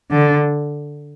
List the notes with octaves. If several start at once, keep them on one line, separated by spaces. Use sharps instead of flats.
D3